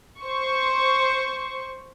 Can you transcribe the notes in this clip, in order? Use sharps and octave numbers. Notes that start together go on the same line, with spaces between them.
C5 C#6